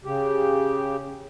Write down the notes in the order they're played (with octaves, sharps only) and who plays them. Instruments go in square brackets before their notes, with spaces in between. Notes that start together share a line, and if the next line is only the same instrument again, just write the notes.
[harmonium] C#3 G4